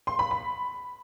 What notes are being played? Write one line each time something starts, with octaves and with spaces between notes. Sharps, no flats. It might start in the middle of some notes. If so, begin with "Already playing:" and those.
C6
B5
B5